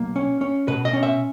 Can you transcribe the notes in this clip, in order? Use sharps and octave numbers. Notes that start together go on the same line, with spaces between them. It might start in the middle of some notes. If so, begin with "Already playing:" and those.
Already playing: B1 A#3
C#4
C#4
B2 B4
D#5
C#4
E5